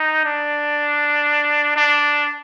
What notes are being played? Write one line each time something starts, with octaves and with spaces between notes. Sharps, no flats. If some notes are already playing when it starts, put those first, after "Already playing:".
Already playing: D#4
D4
D4